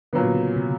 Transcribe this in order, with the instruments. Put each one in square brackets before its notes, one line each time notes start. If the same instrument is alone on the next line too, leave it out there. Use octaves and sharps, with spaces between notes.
[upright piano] A#2 F#3 B3 [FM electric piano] D3
[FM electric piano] D3
C#3
C3